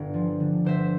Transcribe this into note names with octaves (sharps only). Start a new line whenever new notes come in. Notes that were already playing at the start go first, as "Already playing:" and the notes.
Already playing: G1 G2 D3 G5
F3
D3
G1 C5 E5